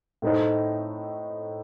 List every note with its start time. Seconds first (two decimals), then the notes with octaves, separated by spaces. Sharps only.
0.22 A2 A3 D#4 A4 C5